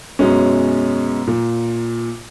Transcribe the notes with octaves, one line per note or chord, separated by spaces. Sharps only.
F#2 B2 G#3 C#4
A#2